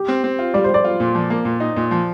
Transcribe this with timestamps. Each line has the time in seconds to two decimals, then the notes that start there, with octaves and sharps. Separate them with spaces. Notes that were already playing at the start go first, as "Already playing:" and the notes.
Already playing: G4
0.08 C4
0.24 C4
0.39 F4
0.54 G3 D5
0.64 G3 C5
0.74 D5
0.84 F4
1.00 A#2
1.15 F3
1.30 A#3
1.45 A#2
1.60 D#4
1.76 A#2
1.91 F3